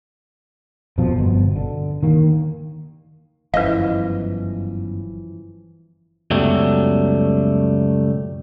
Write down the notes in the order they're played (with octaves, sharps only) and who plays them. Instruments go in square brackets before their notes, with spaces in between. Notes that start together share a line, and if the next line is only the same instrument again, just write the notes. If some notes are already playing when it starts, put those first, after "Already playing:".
[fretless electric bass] F2 B2 F3
G1 B2
D3
D#3 A#3
[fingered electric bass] G1 F#2 [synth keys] E3 F3 [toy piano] B4 F5 [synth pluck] D#5
[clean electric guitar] C#2 F#2 B2 F#3 G3 A3